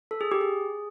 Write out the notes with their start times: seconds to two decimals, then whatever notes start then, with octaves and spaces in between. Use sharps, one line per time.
0.11 A4
0.21 G#4
0.32 G4
0.41 G#4